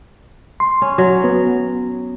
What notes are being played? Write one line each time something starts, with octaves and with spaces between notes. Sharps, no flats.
C6
C#4
F#3
B3